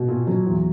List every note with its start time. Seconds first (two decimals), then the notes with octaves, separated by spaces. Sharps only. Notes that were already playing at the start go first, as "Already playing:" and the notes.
Already playing: B2
0.08 A#2
0.27 F#3
0.46 E2